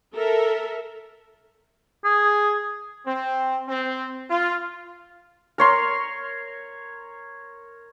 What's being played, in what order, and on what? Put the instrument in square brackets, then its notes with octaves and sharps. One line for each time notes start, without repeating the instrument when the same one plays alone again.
[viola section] A4 A#4 E5
[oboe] G#4
[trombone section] C4
C4
F4
[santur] A#4 C#5 C6